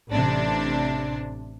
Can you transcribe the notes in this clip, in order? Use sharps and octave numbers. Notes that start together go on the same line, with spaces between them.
A1 C3 D4